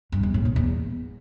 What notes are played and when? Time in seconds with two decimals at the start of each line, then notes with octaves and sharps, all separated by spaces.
0.12 G2
0.23 E2
0.34 A2
0.45 A#2
0.56 E2